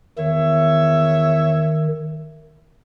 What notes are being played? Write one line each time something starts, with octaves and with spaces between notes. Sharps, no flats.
E2 D#3 C#5 E5